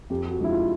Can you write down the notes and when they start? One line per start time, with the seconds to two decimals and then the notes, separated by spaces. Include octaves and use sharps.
0.10 F2 G4
0.31 F#4
0.40 D3 F3 G#3 E4
0.50 F4